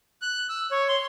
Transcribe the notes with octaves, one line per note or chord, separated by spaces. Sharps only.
F#6
E6
C#5
C6